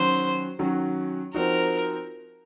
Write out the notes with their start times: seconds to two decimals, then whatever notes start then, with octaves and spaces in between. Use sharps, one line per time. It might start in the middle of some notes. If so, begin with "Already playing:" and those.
Already playing: D#3 F#3 C#4 F#4 C5
0.59 D#3 F#3 C#4 F#4
1.34 F3 C4 D#4 F#4 A#4